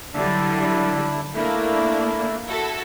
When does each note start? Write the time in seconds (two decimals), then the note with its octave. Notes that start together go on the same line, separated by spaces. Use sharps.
0.14 D3 F#3 G3 D4 E4
1.34 A3 A#3 D4 E4
2.46 E4 F#4 A4